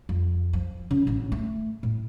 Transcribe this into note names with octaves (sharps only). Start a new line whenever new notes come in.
F2
F3
C#3
A1 D3
A3
A2